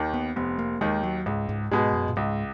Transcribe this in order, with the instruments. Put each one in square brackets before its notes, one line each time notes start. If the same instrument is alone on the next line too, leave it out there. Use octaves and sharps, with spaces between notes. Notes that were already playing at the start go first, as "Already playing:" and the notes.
Already playing: [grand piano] D#2 D#3
[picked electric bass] B3
[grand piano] F1 [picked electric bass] B3
[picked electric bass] A#3
[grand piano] D#2 D#3 [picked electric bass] G#3
[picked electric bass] F#3
[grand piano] C#2 [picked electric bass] G#2
[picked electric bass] G#2
[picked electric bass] G#2 [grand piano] B2 G#3
[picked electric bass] F#2
A#2
[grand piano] C#2 [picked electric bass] G#2